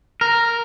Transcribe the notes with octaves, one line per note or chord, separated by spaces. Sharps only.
A#4